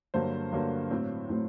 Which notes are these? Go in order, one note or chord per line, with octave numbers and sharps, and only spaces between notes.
G2 D3 F#3 A#3 C5
G2 D3 F#3 A#3
A2 F#3 C4
A2 F#3 C4